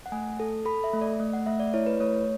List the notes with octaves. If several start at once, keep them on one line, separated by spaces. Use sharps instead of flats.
F#5
A3 G#5
A4
A4 B5
E5
A3
D5
A3
F#5
A3 E5
D5
E4 C#5
B4
A3 C#5